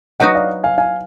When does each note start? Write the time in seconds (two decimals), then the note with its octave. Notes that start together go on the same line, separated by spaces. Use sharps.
0.20 F#3 B3 D#4 F#4 D#5 F#5
0.35 D5 F5
0.64 F5 G#5
0.78 F5 G#5